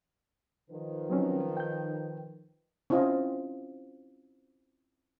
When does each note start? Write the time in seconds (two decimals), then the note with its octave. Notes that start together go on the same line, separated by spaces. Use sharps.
0.70 D#3 F3 B4
1.10 F#3 C4 C#4
1.57 G5 G6
2.90 C4 C#4 E4 F4 D#5